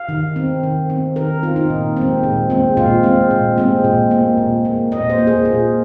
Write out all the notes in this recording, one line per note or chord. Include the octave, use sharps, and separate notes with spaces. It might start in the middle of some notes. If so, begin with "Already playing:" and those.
Already playing: F5
D#3
C4
D#3
C4
D#3 A#4
C4 F4
D#4
A#2
G#3 C4
A#2
G#3 C4
A#2 F4
G#3 C4
A#2
G#3 C4
A#2
A#3
A#2
A#3
A#2 D#5
C5
A#3
G#4
A#2 F4